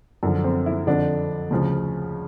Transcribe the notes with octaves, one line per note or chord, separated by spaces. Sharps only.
F#2 D3 F3
C4
E4
F2 D3 F3 D4
D2 C#3 F3